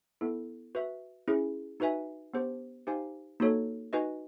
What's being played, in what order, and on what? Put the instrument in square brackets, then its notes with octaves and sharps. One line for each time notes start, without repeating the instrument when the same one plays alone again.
[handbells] B3 E4 A4
F#4 B4 E5
C#4 E4 G#4
D#4 F#4 B4 E5 G#5
B3 D4 G4 C5
D#4 G4 C5 F5 G#5
A#3 D#4 F#4 A4 C#5
D#4 F#4 B4 D#5 G#5